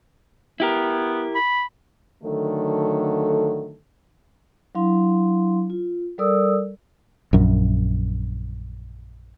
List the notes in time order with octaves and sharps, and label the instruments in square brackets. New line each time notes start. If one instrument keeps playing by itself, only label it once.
[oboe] B3 [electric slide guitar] E4 G4 A#4
[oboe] B5
[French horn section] D3 D#3 F#3 A3 A4
[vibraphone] F#3 D4 E4 F5 C6
F4
G3 A4 A#4 D5 D#6 E6
[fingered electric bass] A#1 F#2